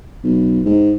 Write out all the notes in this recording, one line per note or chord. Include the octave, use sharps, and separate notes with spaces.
B1
G#2